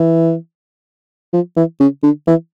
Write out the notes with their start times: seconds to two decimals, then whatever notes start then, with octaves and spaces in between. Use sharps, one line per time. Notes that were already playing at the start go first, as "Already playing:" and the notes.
Already playing: E3
1.33 F3
1.57 E3
1.80 C#3
2.03 D3
2.27 E3